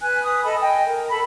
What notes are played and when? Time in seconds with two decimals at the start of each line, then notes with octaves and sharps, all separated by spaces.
0.01 B4 G#5 F#6
0.24 B4 D#6
0.44 A4 D#5 G#5 B5
0.61 D#5 G5 G#5
0.86 A#4
1.10 A4 B5